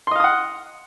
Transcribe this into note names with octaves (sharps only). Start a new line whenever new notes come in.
D#5 F5 F#5 C6 D#6